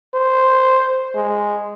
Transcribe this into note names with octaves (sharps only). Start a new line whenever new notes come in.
C5
G#3